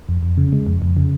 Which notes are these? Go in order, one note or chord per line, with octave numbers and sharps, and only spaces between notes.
F2
F2
C#3
G#3
F2
F2
C#3